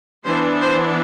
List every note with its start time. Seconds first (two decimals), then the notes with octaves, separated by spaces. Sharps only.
0.25 E3 B3 D4 C5
0.61 C5